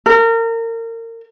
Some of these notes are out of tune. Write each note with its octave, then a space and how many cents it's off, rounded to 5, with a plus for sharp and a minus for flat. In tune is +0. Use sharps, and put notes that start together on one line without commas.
A#4 -30